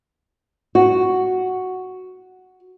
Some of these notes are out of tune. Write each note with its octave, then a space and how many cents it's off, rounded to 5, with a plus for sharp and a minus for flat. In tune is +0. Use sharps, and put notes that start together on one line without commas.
F#4 +0